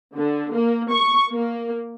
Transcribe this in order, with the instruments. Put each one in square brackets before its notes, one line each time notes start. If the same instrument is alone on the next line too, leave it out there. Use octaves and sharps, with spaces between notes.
[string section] D3
A#3
C#6
A#3